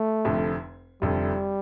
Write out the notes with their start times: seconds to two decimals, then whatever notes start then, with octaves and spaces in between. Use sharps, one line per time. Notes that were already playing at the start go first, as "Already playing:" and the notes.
Already playing: A3
0.25 F1 F2 D3
1.02 F1 F2 D3 G3